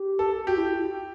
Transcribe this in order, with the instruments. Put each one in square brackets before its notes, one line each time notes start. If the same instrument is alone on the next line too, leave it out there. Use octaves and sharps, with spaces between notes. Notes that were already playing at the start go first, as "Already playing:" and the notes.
Already playing: [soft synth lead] G4
[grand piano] A4
[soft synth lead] F#4 [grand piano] G4
[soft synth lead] E4